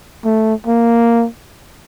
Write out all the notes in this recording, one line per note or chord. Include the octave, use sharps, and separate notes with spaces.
A3
A#3